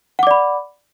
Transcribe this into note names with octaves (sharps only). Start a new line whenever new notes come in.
D5 F#5 B5 D6